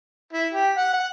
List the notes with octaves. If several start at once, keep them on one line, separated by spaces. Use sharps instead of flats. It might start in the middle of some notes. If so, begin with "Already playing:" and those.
E4
G4
F#5
F#5